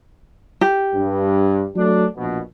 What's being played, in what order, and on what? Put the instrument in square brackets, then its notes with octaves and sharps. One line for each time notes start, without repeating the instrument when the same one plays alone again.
[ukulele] G4
[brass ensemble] G2
F#3 A3 D4
A#1 B2